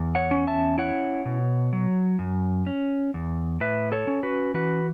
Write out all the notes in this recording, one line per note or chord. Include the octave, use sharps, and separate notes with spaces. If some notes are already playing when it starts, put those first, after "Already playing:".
Already playing: E2
C#5 F#5
C#4
E5 A5
E4 C#5 F#5
B2
F#3
F#2
C#4
E2
A2 B4 E5
A4 C#5
C#4
F#4 B4
E3 F#4 B4